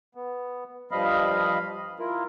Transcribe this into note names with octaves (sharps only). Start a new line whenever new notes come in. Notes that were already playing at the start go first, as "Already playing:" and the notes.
B3
G2 F3 G3 D#5 F5 B5
E4 F4 A#4